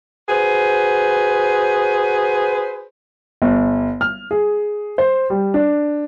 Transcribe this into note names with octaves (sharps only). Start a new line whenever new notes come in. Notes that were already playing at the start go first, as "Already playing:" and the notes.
F#4 G#4 B4 C5
G1
F6
G#4
C5
G3
D4